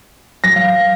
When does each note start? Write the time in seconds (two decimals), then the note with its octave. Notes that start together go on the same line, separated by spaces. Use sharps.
0.44 F#3 A#6
0.56 F5